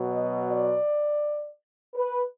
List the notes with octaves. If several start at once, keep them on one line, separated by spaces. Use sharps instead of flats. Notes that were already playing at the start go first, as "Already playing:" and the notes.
Already playing: B2 F#3
D#5
D5
B4